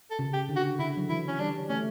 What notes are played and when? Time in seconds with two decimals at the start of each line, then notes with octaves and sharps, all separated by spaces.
0.11 A4
0.19 C#3
0.33 G4
0.49 D3
0.56 F#4
0.79 D3 E4
0.97 F#3
1.09 E3 E4
1.28 C#4
1.39 G3 D4
1.69 A3 C#4